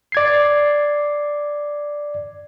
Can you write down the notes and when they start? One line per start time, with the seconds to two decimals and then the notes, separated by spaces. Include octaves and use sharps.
0.12 D5 G#6 C7